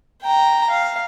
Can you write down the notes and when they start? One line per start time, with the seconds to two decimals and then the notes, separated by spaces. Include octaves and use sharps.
0.22 G5 A#5
0.70 F5